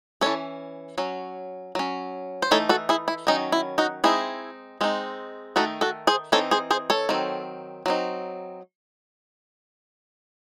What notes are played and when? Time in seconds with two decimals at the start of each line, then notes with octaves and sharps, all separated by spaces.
0.21 E3 A3 C#4 A4 C#5
0.98 F#3 C#4
1.75 F#3 C#4
2.42 C5
2.51 E3 A3 D#4 A4 C#5
2.69 F#4 A4
2.89 E4 G#4
3.08 E4
3.27 D#3 F#3 C#4 D#4
3.52 E4
3.78 D#4 F#4
4.04 G#3 C4 D#4 E4 G#4
4.81 G#3 C4 D#4
5.56 D#3 A3 D#4 F#4 A4
5.81 F#4 A4
6.07 G#4 C5
6.32 E3 C4 D#4 A4 C#5
6.51 G#4 C5
6.70 G#4 C5
6.90 A4 C#5
7.09 D#3 F#3 C4
7.86 F#3 C4 D#4